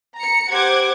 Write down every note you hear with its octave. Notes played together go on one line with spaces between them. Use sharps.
A#5 C#7
G4 C5 F#5 D6 G#6